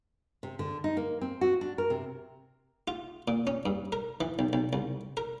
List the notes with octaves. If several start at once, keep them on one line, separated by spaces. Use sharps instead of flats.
C3
D3
D#4
A#3
C4
F#4
D4
A#4
C3
F4
A#2
C#4
G2
A#4
E3
B1
B1
C2
A#4